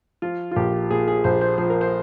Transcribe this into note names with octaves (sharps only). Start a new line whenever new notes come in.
F3 F4
F4
A#1 G4
A#2 G#4
G#4
A#1 C5
C5
F3 C5
A#4
C5